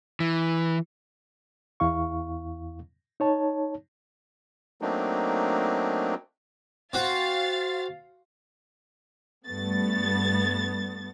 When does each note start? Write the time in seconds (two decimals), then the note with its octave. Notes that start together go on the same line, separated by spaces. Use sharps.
0.20 E3
1.80 E2 E4 F5 C#6
3.20 D#4 C#5 A5
4.82 F#3 A3 A#3 C4 D4 D#4
6.93 C4 F#4 F5 A6
9.47 G2 A3 B3 A6